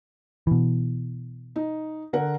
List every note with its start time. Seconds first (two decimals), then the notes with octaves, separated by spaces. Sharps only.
0.47 B2 E3
1.56 D#4
2.13 D3 A#4 F#5